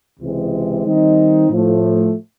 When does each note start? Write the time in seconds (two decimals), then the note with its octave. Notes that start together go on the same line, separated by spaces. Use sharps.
0.19 C#2 C3 E3 G#3 C4
0.84 D#3 G3 C4 D#4
1.49 A2 F3 A3